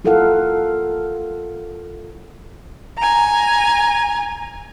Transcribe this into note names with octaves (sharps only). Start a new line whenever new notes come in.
E4 F4 A4 A#4 F5 F#5
G#5 A#5